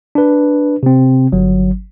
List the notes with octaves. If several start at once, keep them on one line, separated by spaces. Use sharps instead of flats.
D4 B4
C3 C4
G1 F#3